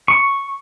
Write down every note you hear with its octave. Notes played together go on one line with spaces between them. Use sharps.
C#6